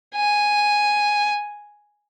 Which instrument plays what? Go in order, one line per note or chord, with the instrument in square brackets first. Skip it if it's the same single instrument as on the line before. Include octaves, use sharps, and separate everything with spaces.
[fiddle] G#5